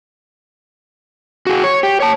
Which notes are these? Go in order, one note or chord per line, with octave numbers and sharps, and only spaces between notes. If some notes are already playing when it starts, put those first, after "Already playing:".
F#4 G#4
C#5
G4
C#5 A5